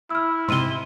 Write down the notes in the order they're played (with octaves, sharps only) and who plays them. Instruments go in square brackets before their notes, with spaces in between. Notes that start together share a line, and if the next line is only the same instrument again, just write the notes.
[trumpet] E4 [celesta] E6 F6
[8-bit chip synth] G#2 C3 [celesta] C6 D#7 G7